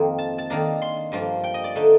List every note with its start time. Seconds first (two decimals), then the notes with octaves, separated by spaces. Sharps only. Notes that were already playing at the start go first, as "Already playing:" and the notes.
Already playing: F2 D#3 A#3
0.18 A5
0.38 A5
0.50 D#3 A#3 D4 A#5
0.82 C6
1.12 G2 F3 A#3 A#5
1.44 G5
1.54 D#5
1.64 D5
1.75 D3 A3 D#4